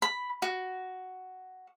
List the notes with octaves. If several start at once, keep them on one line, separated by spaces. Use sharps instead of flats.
B5
F#4